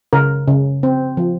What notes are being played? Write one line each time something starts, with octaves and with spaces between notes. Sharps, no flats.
C#3 A#4
C#3
C4
F3